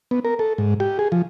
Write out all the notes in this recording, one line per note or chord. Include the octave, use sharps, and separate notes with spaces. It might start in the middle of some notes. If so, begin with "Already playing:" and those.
B3
A#4
A4
G#2
G4
G#4
F3